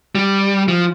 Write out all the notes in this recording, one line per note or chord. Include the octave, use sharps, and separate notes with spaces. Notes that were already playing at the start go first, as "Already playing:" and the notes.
G3
F3